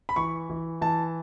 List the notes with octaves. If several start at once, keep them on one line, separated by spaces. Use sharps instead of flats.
B5
E3 C#6
E3
E3 A5